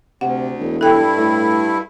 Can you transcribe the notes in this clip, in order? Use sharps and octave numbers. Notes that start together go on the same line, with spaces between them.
D2 C3 F#5
E1
G2 E4 A4 G5
A2